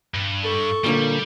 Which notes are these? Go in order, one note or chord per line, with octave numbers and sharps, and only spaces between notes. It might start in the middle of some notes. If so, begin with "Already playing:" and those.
G2
A4 C#6
A#2 D3 G3 A#3